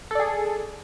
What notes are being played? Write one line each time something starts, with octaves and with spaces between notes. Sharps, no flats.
G#4 A4 D5